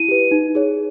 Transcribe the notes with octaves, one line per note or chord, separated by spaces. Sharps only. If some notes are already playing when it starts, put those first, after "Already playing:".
Already playing: E4 D#7
G4 B4
D#4
G#4 C#5